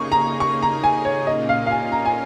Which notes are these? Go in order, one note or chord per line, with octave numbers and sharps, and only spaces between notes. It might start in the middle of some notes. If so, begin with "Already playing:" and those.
Already playing: C#3 A#3 D#4 G#4 C#6
A#5
C#6
A#5
G#5
C#5
A#2 A#3 C#4 F4 D#5
F5
F5
G#5
A#5
G#5